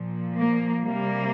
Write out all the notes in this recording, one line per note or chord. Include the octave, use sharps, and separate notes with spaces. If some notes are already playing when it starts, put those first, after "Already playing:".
Already playing: A#2 F3
A#3
C3 G3 A#3